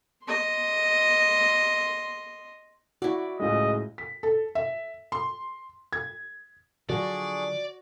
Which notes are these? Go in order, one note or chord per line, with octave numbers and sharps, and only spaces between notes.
D#5 C6
E4 F#4 D5
C#2 A2 G#3 D#5
B6
A4
E5
C6
G#6
D3 F3 F#3 D4 F#4 G#4 D5 C#6